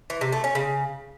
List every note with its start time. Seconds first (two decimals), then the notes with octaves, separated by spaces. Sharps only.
0.10 E3
0.21 C3
0.33 A3
0.44 C#4
0.55 C#3